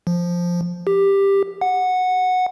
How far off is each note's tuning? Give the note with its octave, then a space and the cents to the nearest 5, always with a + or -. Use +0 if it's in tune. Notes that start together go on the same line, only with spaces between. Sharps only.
F3 +0
G4 +10
F#5 -10